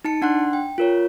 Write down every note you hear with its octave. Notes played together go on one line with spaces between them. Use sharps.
D#4 A5 C#7
D4 F#5 C6 F#6
G5
F4 A#4 C#5